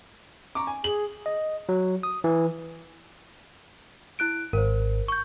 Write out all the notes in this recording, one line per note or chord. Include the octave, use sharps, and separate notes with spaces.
A#5 C#6 D6
G#5
G#4 F#7
D#5
F#3
D#6
E3
E4 F#6 D7
G#1 A#4 C5
C#6 G6